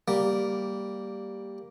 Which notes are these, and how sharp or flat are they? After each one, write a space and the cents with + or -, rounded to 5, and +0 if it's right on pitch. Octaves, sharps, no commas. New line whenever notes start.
G3 +0 A#3 +0